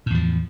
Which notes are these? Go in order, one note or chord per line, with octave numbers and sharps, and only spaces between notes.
E2 A2 F3